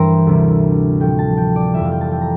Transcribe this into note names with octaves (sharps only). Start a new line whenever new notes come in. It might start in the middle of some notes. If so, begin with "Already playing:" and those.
Already playing: G2 E3 G3 A#4 C5 E5 G5
D2 C3 G3
A2 F3 G5
A5
G5
D5
F2 E3 G3 E5
F5
G5
A5
G5
A#5